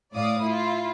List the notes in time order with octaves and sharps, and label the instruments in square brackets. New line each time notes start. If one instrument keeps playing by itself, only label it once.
[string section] A2 D5 F5 D#6
E4 F4